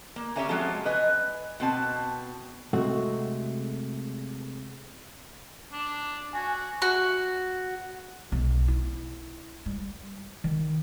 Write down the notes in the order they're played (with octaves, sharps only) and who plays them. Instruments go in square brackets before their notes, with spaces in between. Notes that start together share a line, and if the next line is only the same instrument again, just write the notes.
[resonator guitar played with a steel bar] A#3
C#4 G4 C#5 E5 G#5 A#5
F3 F#3 G#3 C4 F4 A4
B4 D#5 G#5
B2 C4 A5
[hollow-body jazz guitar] C3 G#3 A3 F#4
[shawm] D4
[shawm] F#4 [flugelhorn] G#5
[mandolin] F#4
[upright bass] B1
E4
G3
D#3